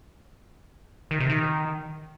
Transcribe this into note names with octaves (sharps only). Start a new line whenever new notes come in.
D#3
C3
D#3